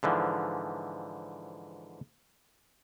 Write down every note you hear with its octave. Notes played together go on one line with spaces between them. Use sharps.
G#2 D3 E3 F3